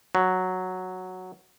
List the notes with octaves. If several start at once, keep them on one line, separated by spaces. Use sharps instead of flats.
F#3